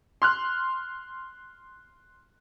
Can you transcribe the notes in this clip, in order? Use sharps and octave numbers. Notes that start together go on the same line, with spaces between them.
C6 F6 F#6